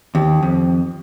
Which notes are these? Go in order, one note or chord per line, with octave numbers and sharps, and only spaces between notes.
D#2
F2